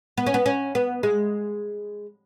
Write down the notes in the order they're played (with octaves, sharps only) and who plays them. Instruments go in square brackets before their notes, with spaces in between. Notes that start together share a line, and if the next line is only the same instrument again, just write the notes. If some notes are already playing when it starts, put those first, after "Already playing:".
[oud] B3
C#4
B3
C#4
B3
G#3